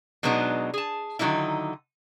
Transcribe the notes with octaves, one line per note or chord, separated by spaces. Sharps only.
B2 F#3 G#3 B3 D4 D#4
G#4 A5
D3 D#3 F#3 A#3 D#4 E4